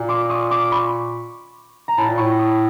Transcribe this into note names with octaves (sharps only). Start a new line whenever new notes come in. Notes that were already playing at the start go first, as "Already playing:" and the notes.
Already playing: A#2
C6 D6
C#6 D#6
C6 D6
B5 C#6
A#5
A2 A5 B5
A#2
A2 B5 C#6
C#6 D#6